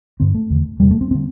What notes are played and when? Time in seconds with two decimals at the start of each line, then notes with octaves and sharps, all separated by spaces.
0.20 G2 D3 C4
0.35 A3
0.50 E2 D3
0.80 E2 C3 G3
0.91 A3
1.01 C4
1.11 D3 C4